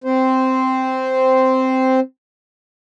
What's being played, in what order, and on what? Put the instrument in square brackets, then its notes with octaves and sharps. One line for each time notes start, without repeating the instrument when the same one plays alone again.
[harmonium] C4 C5